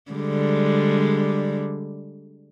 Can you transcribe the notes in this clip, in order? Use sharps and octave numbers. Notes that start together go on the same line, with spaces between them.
D3 G3 G#3